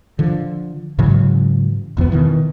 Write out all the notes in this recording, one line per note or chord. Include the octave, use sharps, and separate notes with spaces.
D3 F3
G#2 C#3 E3 F#3
E1 F2 G3 B3
B2 D#3 E3